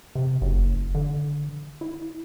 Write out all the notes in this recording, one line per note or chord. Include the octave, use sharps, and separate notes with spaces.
C3
F#1
D3
E4